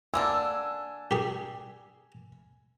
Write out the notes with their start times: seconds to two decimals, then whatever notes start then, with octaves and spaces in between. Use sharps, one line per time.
0.14 D3 A#3 D4 G#5 E6
1.11 G4 G#4